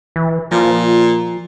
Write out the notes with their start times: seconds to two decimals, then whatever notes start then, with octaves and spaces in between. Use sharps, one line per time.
0.16 E3
0.51 A#2 F3